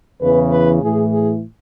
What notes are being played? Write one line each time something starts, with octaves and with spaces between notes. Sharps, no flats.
E2 C#3 E3 B4
B4
A2 E3 G#4
G#4